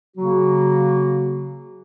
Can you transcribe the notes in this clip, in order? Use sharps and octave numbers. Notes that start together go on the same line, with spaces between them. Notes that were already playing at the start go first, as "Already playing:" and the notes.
C#3 F#3 A#3 F#4